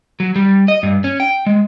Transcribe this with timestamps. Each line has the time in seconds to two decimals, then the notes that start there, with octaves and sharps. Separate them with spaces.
0.20 F#3
0.36 G3
0.68 D#5
0.83 G2
1.04 C#4
1.20 G5
1.46 G#3